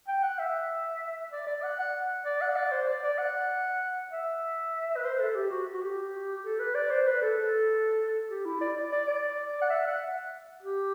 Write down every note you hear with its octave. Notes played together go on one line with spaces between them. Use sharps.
G5
F#5
E5
D5
D5
F#5
F#5
D5
F#5
D5
C5
D5
D5
F#5
E5
B4
C5
A4
G4
F#4
F#4
G4
A4
B4
D5
C5
B4
A4
A4
G4
E4
D5
D5
D5
D5
F#5
E5
F#5
G4